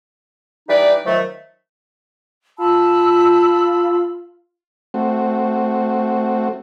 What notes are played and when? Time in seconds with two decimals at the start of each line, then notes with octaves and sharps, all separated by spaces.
0.69 E3 G3 D#4 B4 D5
1.06 D#3 F3 F#3 A3
2.58 F4 A5 B5 E6
4.94 A3 C4 F#4